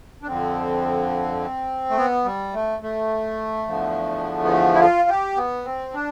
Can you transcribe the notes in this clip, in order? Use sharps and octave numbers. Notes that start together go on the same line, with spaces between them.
D4
F2 D3 F3 C4
A3
B3
G3
A3
A3
E2 D3 F3
B3
A3
E4
F4
G4
B3
C4
D4